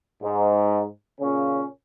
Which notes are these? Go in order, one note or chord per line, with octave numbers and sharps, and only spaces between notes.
G#2
A#2 C#3 C#4